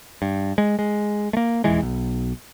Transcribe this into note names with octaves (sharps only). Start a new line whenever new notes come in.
G2
G#3
G#3
A3 A#3
D#1 E2 E3 G#3
B1